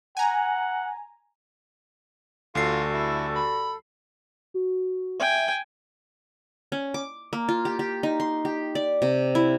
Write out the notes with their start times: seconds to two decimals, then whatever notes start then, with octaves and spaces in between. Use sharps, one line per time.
0.17 F#5 G#5 A#5
2.55 D2 G3 F4 F#4 A4 C7
2.93 E4
3.36 B5
4.54 F#4
5.20 E5 G5 G#5
6.72 C#4
6.94 D6
7.33 A#3
7.49 F4
7.65 G4
7.79 G4
8.03 D#4
8.20 C6
8.45 G4
8.75 D5
9.02 C3
9.35 E4